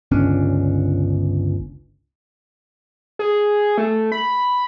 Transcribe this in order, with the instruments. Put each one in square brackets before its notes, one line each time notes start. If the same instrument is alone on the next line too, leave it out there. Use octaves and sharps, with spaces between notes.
[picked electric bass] G1 C#2 C#4 D4
[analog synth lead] G#4
A3
B5